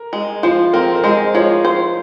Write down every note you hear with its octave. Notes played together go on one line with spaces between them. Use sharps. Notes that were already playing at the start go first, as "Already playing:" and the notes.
Already playing: A#4
G#3
F3 C5
C4 A#4
A#4
G#3 C5
F3 C#5
C5